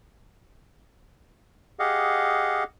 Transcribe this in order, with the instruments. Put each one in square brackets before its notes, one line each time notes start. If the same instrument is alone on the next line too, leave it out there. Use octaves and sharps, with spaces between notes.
[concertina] G4 G#4 D#5 F5 F#5